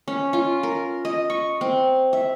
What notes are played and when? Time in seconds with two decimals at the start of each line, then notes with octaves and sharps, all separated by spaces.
0.08 C#4
0.33 F4
0.63 A#4
1.05 D#5
1.30 C#6
1.61 C4
2.13 E5